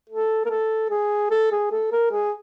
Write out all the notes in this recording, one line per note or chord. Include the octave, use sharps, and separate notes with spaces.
A4
A#4
A4
G#4
A4
G#4
A4
A#4
G#4